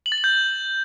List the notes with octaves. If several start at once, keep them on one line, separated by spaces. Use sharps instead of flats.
F#7
A6
F#7
G6